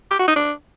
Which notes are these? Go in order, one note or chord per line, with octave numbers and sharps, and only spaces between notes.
G4
F#4
D#4
D4